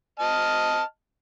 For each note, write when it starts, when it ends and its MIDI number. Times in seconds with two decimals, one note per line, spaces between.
0.20 0.82 75
0.20 0.82 81
0.20 0.82 89